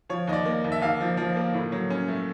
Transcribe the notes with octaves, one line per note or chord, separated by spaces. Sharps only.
F3 C#5
D#2 D#5
D5
A#3
D#2
E5
D#2 F5
F3
F3
A#3
A2
F#3
C#4
A3